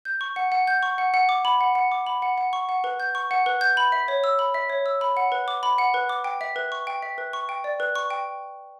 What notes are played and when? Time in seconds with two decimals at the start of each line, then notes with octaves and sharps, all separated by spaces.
0.05 G6
0.21 C#6
0.36 F#5
0.52 F#5
0.67 G6
0.83 C#6
0.98 F#5
1.14 F#5
1.29 D6
1.45 B5
1.61 F#5
1.75 F#5
1.92 D6
2.06 B5
2.22 F#5
2.38 F#5
2.53 C#6
2.69 F#5
2.84 B4
3.00 G6
3.15 C#6
3.31 F#5
3.46 B4
3.61 G6
3.77 B5
3.92 E5
4.08 C#5
4.24 E6
4.39 B5
4.54 E5
4.70 C#5
4.86 E6
5.01 B5
5.17 F#5
5.32 B4
5.48 D6
5.63 B5
5.78 F#5
5.94 B4
6.09 D6
6.24 G5
6.41 E5
6.56 B4
6.72 C#6
6.87 G5
7.02 E5
7.18 B4
7.33 C#6
7.49 G5
7.64 D5
7.80 B4
7.96 C#6
8.11 G5